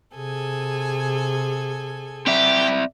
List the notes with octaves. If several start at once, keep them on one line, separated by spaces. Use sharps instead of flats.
C3 G#4 A4 G#5
C4 G4 D5 E5